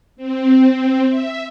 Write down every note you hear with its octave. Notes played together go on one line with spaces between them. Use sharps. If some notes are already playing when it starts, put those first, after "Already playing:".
C4
E5